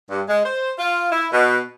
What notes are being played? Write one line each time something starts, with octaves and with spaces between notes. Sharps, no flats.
G2
G#3
C5
F4
E4
B2